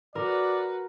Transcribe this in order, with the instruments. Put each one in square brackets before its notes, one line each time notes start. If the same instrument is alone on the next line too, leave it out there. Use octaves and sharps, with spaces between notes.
[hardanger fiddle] F#4 B4 [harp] A#4 [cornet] D5